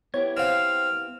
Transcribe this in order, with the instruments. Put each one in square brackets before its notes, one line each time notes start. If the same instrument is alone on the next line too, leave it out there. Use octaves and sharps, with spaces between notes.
[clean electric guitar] B3 E4 G4 [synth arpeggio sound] C#5 G#6
[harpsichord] C4 F5 [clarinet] F6